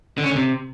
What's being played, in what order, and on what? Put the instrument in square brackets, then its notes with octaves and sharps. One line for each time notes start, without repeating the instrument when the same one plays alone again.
[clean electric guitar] D3
C#4
D3
C3